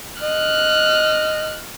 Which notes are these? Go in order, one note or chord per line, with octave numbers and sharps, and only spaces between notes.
D#5 F6 F#6